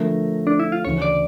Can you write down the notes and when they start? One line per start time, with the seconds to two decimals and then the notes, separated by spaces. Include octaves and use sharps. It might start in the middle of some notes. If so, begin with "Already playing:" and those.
Already playing: D3 F3 A3 A#4
0.47 D4
0.60 E4
0.72 F4
0.85 D2 C#3 E3 C#5
1.02 D5